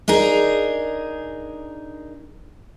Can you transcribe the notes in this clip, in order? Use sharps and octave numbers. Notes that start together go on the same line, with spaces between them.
D4 D#4 G#4 A#4